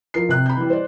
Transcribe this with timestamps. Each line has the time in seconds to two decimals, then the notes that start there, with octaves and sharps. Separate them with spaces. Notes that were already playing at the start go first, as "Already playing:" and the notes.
0.14 F3 A#4 C7
0.29 C3 F#6
0.46 B5 G6
0.57 E3 G3
0.70 C5 D5